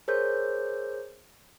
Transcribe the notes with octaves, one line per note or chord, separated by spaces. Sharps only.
G#4 A#4 C5 C#5 G6